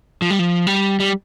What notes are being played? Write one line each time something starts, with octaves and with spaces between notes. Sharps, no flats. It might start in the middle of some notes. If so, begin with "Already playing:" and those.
F3
G3
F3
G3
G3